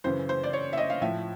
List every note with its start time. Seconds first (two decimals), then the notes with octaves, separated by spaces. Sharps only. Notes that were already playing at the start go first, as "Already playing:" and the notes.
0.04 F#2 C#3 E3 C5
0.29 C5
0.44 D5
0.53 C#5
0.73 E5
0.77 D#5
0.90 F5
1.01 A2 F3 E5